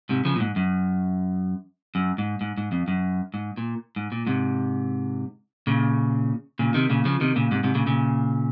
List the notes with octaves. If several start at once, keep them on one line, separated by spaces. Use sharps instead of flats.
G#2 C3
C#3 F3
A#2
G#2
F#2
F#2
G#2
G#2
G#2
F2
F#2
G#2
A#2
G#2
A#2
G#2 C3
A#2 C#3
A#2 C#3
C3 D#3
A#2 C#3
C#3 F3
C3 D#3
A#2 C#3
G#2 C3
G#2 C3
A#2 C#3
A#2 C#3